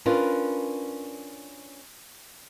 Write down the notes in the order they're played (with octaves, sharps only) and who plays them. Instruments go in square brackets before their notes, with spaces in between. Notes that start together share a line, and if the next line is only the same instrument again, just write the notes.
[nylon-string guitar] C#4 D4 F4 A#4 B4